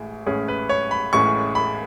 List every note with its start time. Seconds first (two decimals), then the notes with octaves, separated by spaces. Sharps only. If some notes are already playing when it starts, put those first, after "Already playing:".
Already playing: A1 A2 G#3
0.26 A1 A2 G#3 C#4 G#4
0.48 B4
0.69 C#5
0.91 B5
1.13 A1 A2 G#3 C#4 C#6
1.55 B5